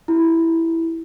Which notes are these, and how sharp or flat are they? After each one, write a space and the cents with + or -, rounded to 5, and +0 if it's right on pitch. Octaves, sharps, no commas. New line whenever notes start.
E4 +0 G4 -20